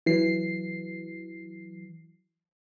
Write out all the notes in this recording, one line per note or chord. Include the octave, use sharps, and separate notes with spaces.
E3 F#3 C7